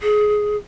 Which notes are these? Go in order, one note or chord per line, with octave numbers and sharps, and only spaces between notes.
G#4